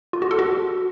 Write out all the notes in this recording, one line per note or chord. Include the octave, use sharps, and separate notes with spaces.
F4
F#4
A4
F#4